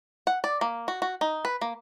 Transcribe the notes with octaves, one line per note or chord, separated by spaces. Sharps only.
F#5
D5
A#3
F#4
F#4
D#4
B4
A#3